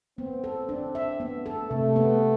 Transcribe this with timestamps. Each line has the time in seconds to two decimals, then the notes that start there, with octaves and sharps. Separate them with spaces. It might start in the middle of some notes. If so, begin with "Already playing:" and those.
0.18 B3 C4
0.44 A4
0.69 D4
0.95 E5
1.20 B3
1.46 A4
1.71 C3 A3
1.96 B3